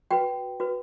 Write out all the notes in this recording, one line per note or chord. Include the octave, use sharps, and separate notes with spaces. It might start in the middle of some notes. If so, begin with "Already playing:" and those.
F#4 B4 G5
F#4 B4